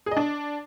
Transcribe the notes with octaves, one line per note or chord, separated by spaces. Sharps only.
G#4
D#5
D4